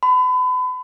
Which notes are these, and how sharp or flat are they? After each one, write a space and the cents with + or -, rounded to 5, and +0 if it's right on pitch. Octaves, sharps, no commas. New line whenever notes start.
B5 +35